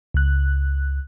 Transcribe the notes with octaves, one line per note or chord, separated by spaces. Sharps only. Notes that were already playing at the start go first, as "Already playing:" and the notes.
C#2 F#6